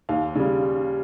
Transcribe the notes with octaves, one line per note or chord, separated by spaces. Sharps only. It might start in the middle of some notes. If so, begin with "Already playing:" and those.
D#2 F5
C#3 G3